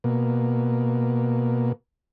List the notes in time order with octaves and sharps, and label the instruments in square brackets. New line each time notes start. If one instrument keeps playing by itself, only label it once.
[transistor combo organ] B2 A#3